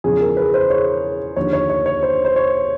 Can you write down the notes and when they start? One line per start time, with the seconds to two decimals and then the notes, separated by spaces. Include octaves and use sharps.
0.04 E2 C#3 F3 G#4
0.21 A#4
0.37 B4
0.54 C5
0.70 C#5
1.36 D#2 D3 F3 C#5
1.53 C#5
1.70 C#5
1.86 C#5
2.03 C5
2.25 C5
2.36 C#5